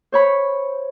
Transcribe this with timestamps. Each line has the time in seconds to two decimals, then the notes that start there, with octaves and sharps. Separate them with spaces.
0.12 C5 C#5 B5